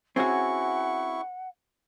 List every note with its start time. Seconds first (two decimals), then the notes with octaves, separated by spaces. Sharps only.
0.16 C4 C#4 E4 F#4 G#4 F#5 C#6